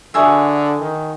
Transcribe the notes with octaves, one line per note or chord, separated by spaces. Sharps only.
D3 F#4 G#4 E5
D#3